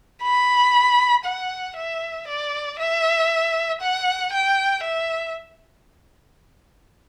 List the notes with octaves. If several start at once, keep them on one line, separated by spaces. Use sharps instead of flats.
B5
F#5
E5
D5
E5
F#5
G5
E5